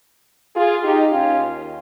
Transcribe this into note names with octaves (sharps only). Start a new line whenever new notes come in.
F4 G#4
D#4 G4
D#2 D#3 C#4 F4